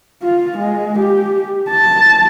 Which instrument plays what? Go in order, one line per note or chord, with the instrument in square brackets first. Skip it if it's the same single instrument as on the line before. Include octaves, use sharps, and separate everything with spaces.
[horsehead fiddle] F4
G#3
G4
A5